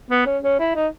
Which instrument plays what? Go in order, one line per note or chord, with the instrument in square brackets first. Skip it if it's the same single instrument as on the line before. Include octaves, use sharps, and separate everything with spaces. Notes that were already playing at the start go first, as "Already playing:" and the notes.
[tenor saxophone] B3
C#4
C#4
E4
D#4